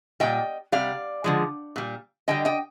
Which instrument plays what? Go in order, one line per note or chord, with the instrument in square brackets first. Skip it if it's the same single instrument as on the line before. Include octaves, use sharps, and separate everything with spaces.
[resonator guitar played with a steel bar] A#2 G3 D#5 G5
C3 G3 D5 F5
D3 F3 G#3
A#2 G3
D3 G3 D#5 G5
D#5 G5